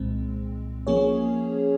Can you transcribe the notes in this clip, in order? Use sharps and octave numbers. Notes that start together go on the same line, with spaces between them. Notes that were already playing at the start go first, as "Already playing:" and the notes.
Already playing: C2 A#2 G#3 C4
F3 A#3 C#4 G#4 C#5